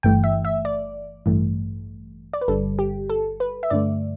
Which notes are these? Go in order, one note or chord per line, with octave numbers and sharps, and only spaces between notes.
G1 G2 E3 A3 G5
E5
E5
D5
A1 G2 E3 A3
D5
B4
G1 G2 D3 G3 A4
G4
A4
B4
E5
G2 D3 A3 D5